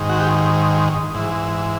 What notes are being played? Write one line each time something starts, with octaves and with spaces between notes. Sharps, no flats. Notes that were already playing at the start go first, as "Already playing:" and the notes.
Already playing: G#2 D#3
F#4
G4
G#2 E3